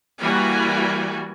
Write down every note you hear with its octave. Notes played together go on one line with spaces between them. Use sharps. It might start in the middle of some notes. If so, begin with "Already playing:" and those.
E3 G3 A#3 F#4 G#5